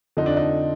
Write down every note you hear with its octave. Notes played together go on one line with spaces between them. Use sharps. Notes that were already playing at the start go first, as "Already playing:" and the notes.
F2 D3 F3 D#4
D4
D#4